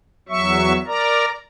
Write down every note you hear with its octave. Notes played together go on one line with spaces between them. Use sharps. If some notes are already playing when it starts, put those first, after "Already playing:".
E2 F#3 E5 C#6
A#4 D5 A#5